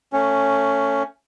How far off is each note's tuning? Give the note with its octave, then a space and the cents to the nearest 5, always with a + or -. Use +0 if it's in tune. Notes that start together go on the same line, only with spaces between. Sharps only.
A3 +25 C#4 +0